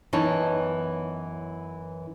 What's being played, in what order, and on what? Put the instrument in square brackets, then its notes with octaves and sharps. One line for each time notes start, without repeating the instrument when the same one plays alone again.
[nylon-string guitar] F#2 E3 B3 D#4 C#5 A5